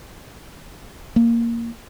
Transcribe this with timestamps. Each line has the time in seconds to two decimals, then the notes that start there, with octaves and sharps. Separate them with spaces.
1.16 A#3